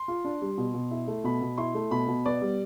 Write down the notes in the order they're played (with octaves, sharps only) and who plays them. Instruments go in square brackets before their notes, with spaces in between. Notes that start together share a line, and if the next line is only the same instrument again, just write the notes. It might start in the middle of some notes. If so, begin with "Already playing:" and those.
Already playing: [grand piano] C6
[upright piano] F4
D4
G3
B2
B2
E4
A3
[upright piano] B2 [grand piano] B5
[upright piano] B2
[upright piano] E4 [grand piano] C6
[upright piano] A3
[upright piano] B2 [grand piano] B5
[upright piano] B2
[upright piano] B3 [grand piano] D5
[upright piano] G3